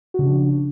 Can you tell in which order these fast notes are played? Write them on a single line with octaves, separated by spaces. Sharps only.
F#4 C#3 D4 F3